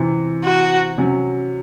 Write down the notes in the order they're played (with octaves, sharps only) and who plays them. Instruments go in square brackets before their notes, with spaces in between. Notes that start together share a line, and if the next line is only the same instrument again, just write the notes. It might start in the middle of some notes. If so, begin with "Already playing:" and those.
Already playing: [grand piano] C3 E3 C4
[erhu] F#4
[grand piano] C3 F#3 C#4